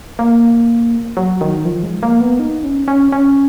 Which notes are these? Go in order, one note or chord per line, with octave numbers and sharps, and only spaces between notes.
A#3
F#3
D#3
F3
G#3
A#3
B3
D#4
C#4
C#4
C#4